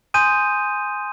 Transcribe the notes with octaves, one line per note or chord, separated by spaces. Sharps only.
G#5 C6 D#6 G6 D#7